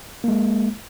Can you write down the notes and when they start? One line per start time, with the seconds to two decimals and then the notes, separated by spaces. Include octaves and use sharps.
0.24 G#3 A#3